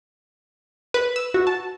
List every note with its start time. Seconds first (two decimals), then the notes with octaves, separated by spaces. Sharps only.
0.94 B4
1.16 E6
1.34 F#4
1.47 A5